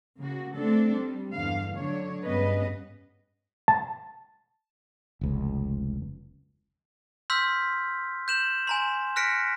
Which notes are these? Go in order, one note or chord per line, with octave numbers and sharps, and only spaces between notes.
C#3 A#3 F#4
A3 C4 D4 A4
G3
E2 G2 D3 F5
D3 F#3 D4 C#5
G2 C#3 B3 B4 D#5
A5
F1 C#2
C6 E6 F6 G6 B6
G6 E7 F#7
G#5 A#5 C6
F6 F#6 A#6 B6 C#7 D7